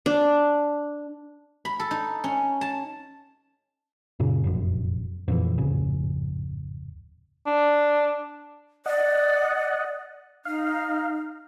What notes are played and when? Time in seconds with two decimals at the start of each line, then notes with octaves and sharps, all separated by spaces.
0.06 D4
1.65 B5
1.80 A4
1.91 D#4
2.24 C#4
2.61 A5
4.20 F#2 A#2 C#3
4.44 F1 A#1 F#2
5.28 F2 A#2 E3
5.58 D1 G#1 F2 C#3
7.46 D4
8.86 D5 D#5 F#5
10.45 D#4 F5